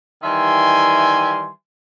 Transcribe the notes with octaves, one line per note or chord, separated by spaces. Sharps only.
D#3 E3 G3 E5 G#5 C6